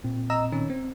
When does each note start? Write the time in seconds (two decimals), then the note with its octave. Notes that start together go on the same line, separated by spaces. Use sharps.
0.04 A#2 C4
0.30 D#5 A#5 E6
0.52 D#3 C#4
0.70 C4